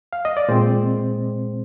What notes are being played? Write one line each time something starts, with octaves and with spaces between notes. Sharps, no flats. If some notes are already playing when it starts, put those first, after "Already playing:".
F5
D#5
D5
A#2 G#3 C4 C5